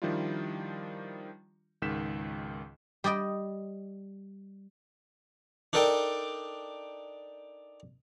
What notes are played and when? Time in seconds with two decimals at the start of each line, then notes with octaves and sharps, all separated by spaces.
0.02 D#3 F3 G3 D4 E4 F4
1.82 C#2 G#2 D#3 G6 B6 E7
3.04 G3 D5 D#5 G5
5.73 D4 D#4 A4 A#4 D5 G5